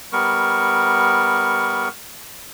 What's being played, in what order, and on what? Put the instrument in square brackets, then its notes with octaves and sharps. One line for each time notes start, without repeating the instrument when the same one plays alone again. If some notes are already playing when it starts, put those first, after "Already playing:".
[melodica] G3 B3 A#4 C#6